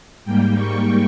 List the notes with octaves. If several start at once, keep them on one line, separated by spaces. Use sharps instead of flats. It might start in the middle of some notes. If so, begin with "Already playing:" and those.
G#2 G3 A#3 G5
C#6